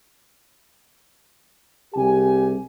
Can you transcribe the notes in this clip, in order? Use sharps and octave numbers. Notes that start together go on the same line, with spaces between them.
C2 G4 G#4 G#5